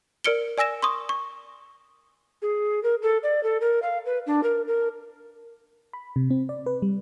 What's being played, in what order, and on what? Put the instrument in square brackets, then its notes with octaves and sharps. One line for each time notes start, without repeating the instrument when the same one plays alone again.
[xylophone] A#4 D5 F6 C#7 D7 G7
D5 G#5 E6 A#6 E7
C6 C#6 D#6
C#6
[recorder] G#4
A#4
A4
D5
A4
A#4
F5
B4
D4
A#4
A#4
[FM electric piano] B5
C3
C4
D5
B4
G3